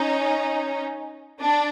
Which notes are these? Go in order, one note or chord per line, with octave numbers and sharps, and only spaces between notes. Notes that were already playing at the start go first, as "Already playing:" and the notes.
Already playing: C#4 D#4
D4